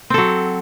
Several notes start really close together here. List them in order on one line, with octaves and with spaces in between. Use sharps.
C4 A4 F#3